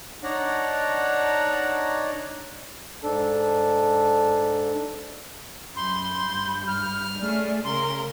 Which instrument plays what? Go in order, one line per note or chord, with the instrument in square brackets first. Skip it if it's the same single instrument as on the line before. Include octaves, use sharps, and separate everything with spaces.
[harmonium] D4 D#4 C#5 D5 F#5 A#5
[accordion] G#2 D4 A4
[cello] F#2 [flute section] B5 G6 [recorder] C6
[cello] G2
[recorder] F6
[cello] A3 G#4 [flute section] C#4 D5
[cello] C#3 A#4 [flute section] A#5 [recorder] C6